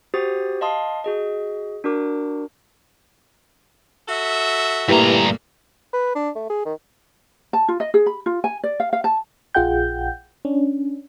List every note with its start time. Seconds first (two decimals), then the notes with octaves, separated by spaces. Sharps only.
0.14 F#4 G4 C5 D#6 A6
0.61 D#5 F5 A5 C6 D#6
1.04 F#4 G#4 D#5
1.84 D4 F#4 A#4 D6
4.08 F#4 A4 E5
4.88 G2 A#2 A3 A#3 E4 G4 B4 A#5
5.93 B4
6.15 D4
6.35 A3
6.50 G#4
6.65 D#3
7.53 A5
7.68 F4
7.80 D#5
7.94 G#4
8.06 B5
8.26 F4
8.44 G#5
8.63 D5
8.80 F5
8.93 F5
9.04 A5
9.55 A#1 F4 G#4 F#5 G5 G6
10.45 C#4 D4